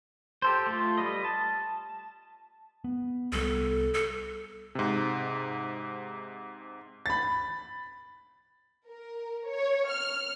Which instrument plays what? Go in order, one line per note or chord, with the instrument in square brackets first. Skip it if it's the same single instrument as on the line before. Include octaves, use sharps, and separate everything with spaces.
[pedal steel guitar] G4 A4 C5
A3 F4
G3 B4 D#5
A5
[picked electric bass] B3
[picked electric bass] C2 G3 B3 [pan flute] A4
[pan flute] A4
[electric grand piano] G#2 C3
[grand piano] B5 A6
[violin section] A#4
C#5
F6